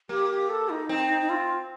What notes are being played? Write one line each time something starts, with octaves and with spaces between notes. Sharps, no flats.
A#3 G4
G4
A4
D#4
C4 D#4
D#4
D#4
F4